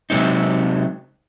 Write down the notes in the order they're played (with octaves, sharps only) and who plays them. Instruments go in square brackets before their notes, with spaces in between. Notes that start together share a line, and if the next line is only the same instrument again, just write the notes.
[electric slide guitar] C3 F#3 G#3 C4 D#4